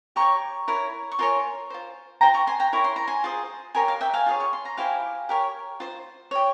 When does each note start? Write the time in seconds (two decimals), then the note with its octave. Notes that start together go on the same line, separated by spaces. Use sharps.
0.16 G4 C#5 A#5 C#6
0.68 E4 A#4 C#5
1.12 C#6
1.19 F4 A#4 C#5 G#5 C6
1.70 F4 C5
2.21 F4 C5 G5 A#5
2.34 A#5 C#6
2.47 G#5 C6
2.60 G5 A#5
2.73 E4 A#4 C#5 C#6
2.84 C6
2.96 A#5
3.07 G#5 C6
3.24 F4 G#4 C5
3.75 G4 A#4 C#5 G#5 C6
3.88 F5
4.01 E5 G5
4.14 F5 G#5
4.26 F4 G#4 C#5
4.40 C#6
4.53 C6
4.65 A#5
4.77 E4 G4 C5 F5 G#5
5.29 G4 A#4 C#5
5.80 F4 C5
6.31 G4 C#5